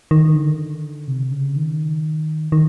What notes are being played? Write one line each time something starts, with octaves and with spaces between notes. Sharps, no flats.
D#3
D3
C3
C#3
D#3
D#3